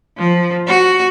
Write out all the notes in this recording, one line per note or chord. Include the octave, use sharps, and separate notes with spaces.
F3
F#4